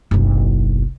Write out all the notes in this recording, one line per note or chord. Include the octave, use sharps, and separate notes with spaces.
F#1 B1